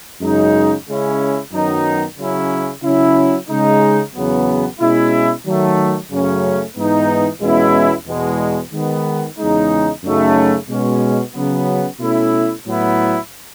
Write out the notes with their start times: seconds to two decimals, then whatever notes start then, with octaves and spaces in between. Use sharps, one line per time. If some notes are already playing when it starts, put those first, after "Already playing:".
0.21 F#2 C#3 G#3 D#4
0.88 C#3 G#3 C#4 E4
1.52 F#2 D#3 F#3 B3 D#4
2.18 C#3 F#3 C#4 E4
2.83 C#3 F#3 C#4 E4
3.48 C#3 G#3 D#4
4.15 E2 C#3 F#3 B3
4.80 B2 G#3 C#4 E4
5.45 D#3 F#3 A3
6.11 F#2 C#3 F#3 A3 C#4
6.76 G#2 E3 B3 D#4
7.42 E2 B2 G#3 C#4 E4
8.07 E2 B2 G#3
8.73 D#3 G#3 B3
9.39 E2 C#3 G#3 D#4
10.04 F#2 C#3 F#3 A3 D#4
10.69 B2 G#3 C#4
11.34 C#3 F#3 B3
12.00 B2 A3 C#4 E4
12.65 A2 F#3 B3 E4